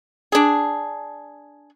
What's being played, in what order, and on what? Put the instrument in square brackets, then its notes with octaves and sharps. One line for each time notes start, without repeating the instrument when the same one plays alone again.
[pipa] D4 G#4